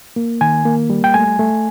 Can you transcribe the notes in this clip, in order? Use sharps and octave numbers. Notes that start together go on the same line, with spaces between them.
A#3
D#3 G#5
A#3
G3
G5
A3 G#5
A3